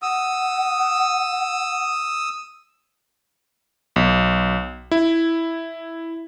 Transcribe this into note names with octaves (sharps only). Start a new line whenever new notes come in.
F#5 D#6 E6
B1
E4